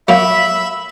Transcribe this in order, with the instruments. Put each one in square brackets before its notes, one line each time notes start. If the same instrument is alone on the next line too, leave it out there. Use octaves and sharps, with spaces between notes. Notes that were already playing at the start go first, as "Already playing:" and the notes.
[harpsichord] F#3 A#3 [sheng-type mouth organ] E5 B5